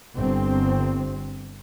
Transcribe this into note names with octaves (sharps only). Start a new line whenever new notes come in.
G1 C4